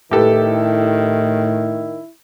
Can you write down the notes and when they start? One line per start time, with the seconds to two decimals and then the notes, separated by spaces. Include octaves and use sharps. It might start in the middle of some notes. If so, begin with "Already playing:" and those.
0.11 A2 D#3 E4 G4 A4 B4